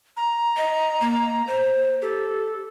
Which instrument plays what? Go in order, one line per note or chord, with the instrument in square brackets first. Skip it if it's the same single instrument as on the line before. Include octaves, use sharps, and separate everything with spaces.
[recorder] A#5
[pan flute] D#5
A#3
C5
[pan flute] G4 [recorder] A4